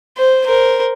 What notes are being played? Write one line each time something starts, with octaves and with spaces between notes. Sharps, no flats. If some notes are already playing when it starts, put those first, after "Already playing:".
C5
A#4 C5